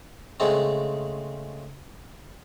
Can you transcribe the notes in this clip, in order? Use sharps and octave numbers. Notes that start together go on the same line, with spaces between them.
C#3 G#3 A3 C4